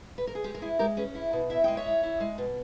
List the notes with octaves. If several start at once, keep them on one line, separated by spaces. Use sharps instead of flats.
B4
A#4
G#4
G#3 G4
A#4
E4 G#4
G#3 G4 A#4
C#4 G#4 B4
E4
B2
E4 E5
G#3 G5
C#5 E5
E4
E4
G#3
B2